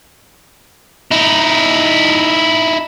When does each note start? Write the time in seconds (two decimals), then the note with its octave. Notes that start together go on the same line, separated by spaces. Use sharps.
1.11 D#4 E4